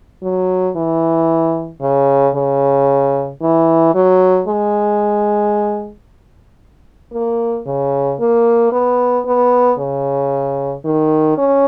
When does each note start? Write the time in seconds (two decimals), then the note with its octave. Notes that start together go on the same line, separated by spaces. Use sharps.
0.23 F#3
0.76 E3
1.81 C#3
2.35 C#3
3.42 E3
3.94 F#3
4.47 G#3
7.13 A#3
7.66 C#3
8.20 A#3
8.72 B3
9.25 B3
9.79 C#3
10.85 D#3
11.37 C#4